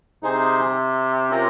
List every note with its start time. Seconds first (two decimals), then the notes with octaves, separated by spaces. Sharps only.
0.22 C3 D#4 G#4 C5
1.30 C#4 F4 A#4